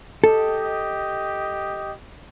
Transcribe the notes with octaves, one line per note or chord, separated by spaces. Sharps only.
G4 A4 D#5